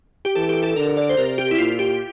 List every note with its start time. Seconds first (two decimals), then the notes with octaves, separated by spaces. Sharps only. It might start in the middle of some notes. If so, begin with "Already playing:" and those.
0.25 G4
0.35 E3 A4
0.49 G4
0.63 A4
0.76 D3 A#4
0.97 D5
1.09 C5
1.17 C3 A#4
1.38 G4
1.51 E4
1.58 A#2 F4
1.79 G4